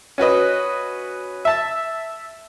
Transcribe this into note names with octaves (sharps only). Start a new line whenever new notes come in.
C#4 F#4 B4 D#5
E5 A5